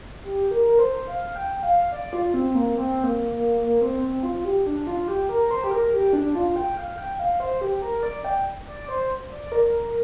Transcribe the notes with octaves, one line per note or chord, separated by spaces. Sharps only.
G4
A#4
C5
F5
G5
G5
F5
D5
F4
C4
A#3
C4
A#3
A#3
A#3
C4
C4
F4
G4
D4
F4
G4
A#4
C5
G4
A#4
G4
D4
F4
G5
F5
G5
G5
F5
C5
G4
A#4
D5
G5
D5
C5
D5
A#4